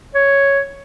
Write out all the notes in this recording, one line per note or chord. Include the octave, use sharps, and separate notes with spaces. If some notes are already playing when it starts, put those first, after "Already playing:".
C#5